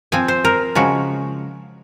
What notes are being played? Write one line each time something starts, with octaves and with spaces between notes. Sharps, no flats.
F3 C4 G#5
C5
A#4
C#3 F3 G#3 F#4